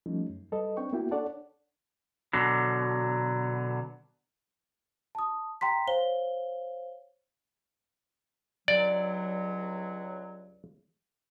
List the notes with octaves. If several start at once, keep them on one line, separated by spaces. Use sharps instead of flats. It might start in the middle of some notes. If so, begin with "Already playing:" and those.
F3 G3 A3 C#4 D#4
F#2
G3 A4 B4 D#5
C4 D4 G5 C#6
A#3 B3 E4 F#4 G5
D4 A4 C#5 D5 F#5 A5
B2 D3 F#3
A5 D#6
G5 A#5 C6 B6
C5 C#5 F5 G7
C#2 G2 F#3 D5